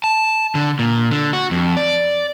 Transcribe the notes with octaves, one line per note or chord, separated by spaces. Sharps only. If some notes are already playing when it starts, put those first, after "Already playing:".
A5
D3
A#2
D3
F#4
F2
D5